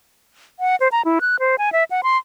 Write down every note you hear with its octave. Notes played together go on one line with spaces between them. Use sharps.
F#5
C5
A#5
E4
F#6
C5
G#5
E5
F#5
C6